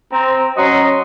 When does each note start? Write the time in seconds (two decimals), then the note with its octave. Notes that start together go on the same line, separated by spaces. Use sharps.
0.12 C4 A#5
0.57 F#3 C#4 F#4 D#5 A#5 C6